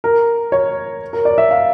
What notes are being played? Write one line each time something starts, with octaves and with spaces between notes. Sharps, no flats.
A#4
C#5
A#4
D5
E5
F5